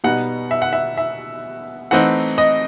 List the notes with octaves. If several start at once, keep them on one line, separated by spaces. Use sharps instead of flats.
B2 G3 B3 D#4 F#5
E5
F#5
E5
E5
E3 A3 C4 D#4 F#5
D#5